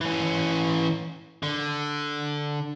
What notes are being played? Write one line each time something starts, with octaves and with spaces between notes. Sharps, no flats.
E3 C#4
D3